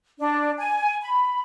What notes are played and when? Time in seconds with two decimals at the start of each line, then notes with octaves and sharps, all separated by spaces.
0.19 D4
0.59 G#5
1.02 B5